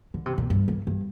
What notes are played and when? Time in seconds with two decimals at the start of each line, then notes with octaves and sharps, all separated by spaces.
0.14 D3
0.26 C3
0.38 A#2
0.50 G2
0.68 F2
0.87 G2